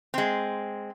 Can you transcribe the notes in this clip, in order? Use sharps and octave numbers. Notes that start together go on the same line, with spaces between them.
G#3 C4